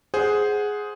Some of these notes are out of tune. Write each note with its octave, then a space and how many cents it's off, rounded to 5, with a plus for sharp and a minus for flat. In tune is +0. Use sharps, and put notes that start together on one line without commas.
G#4 +5 C5 +0 F#5 +0